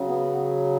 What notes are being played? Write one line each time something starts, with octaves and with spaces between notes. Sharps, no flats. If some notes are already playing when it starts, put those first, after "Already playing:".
Already playing: C#3 F#3
B3